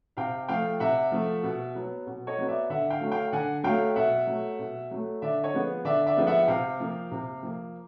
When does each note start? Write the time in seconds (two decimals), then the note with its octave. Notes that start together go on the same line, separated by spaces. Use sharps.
0.17 C3 F5 G5
0.48 F3 A3 F5 G5
0.80 C3 E5 F#5
1.12 F3 A3
1.43 B2
1.75 F#3 B3
2.07 B2
2.27 C#5 D#5
2.38 F#3 B3
2.48 D5 E5
2.70 D3 E5 F#5
2.90 F5 G5
3.01 F#3 A3
3.12 F5 G5
3.32 D3 F#5 G#5
3.64 F#3 A3 F5 G5
3.96 B2 E5 F#5
4.27 F#3 A3
4.59 B2
4.91 F#3 A3
5.22 D3 D5 E5
5.43 C#5 D#5
5.54 F3 G#3 B3
5.85 D3 D5 E5
6.06 D5 E5
6.17 F3 G#3 B3
6.27 E5 F#5
6.39 F#5
6.48 C3 F5 G5
6.80 F3 A#3
7.11 C3
7.43 F3 A#3